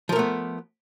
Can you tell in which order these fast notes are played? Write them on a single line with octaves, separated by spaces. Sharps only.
F3 A#4 A3 B3